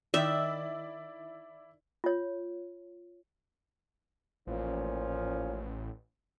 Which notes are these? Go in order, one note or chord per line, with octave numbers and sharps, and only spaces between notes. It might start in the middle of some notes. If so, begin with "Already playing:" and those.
D#3 E4 D5 E5
F4 C#5
A1 A#2 F3 C#4